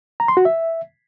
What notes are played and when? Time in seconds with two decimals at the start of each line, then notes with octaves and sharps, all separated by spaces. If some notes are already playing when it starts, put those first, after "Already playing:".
0.20 A#5
0.28 C6
0.37 F#4
0.45 E5